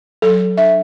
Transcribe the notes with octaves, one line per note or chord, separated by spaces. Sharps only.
F#3 A4
D4 E5